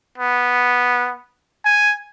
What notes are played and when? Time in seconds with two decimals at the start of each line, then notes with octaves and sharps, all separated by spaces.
0.18 B3
1.65 G#5